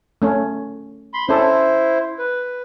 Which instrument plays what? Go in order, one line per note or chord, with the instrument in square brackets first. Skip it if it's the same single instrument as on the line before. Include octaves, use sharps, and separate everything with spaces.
[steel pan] A3 C#4
[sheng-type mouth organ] B5 C6
[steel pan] C#4 A4 [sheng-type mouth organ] E4 C5
[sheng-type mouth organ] B4